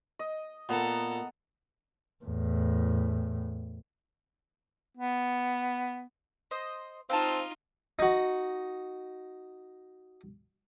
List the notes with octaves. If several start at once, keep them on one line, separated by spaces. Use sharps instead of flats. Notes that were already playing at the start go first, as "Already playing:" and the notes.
D#5
A#2 B3 A4 A#5
E2 A2
B3
C5 D#5
C4 D#4 F4 F5 G#5 A5
D#4 F#4